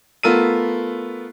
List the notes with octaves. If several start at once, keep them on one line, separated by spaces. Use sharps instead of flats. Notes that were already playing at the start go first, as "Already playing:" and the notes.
A3 B3 F4 A#4 E6 D#7